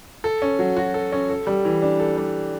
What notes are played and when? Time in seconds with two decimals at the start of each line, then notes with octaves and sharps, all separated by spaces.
0.24 A4
0.42 C#4
0.59 F#3
0.77 F#4
0.94 A4
1.12 C#4
1.29 A4
1.47 G3
1.65 E3
1.82 D4
2.00 A4
2.17 G3